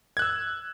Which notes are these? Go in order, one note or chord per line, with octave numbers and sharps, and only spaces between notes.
E6 F#6 G#6